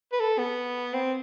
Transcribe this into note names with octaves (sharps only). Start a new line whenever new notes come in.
B4
A4
B3
C4